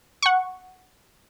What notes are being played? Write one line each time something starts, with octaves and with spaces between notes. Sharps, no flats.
F#5 C#6